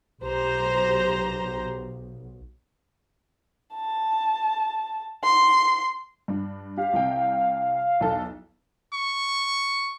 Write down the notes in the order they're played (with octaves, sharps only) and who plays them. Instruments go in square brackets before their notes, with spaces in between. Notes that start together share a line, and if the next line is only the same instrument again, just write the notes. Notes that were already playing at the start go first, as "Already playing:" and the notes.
[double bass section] B1 [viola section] G4 C5 A#5
[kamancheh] A5
C6
[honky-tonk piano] G2 D4
[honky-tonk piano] G4 [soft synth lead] F5
[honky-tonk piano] C2 C3 G5
B1 E2 A4
[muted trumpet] C#6